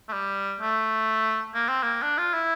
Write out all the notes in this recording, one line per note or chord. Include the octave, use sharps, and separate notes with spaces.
A3
G3
A3
A#3
C4
A#3
D4
F4
E4